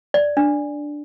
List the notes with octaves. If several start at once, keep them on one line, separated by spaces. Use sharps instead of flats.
D5
D4